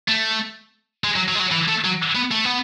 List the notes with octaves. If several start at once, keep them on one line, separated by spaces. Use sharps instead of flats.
A3
G#3
F#3
F#3
G#3
F#3
E3
A3
F#3
B3
A3
B3